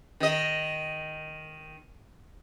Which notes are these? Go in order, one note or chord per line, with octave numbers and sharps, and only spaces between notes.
D#3 D#5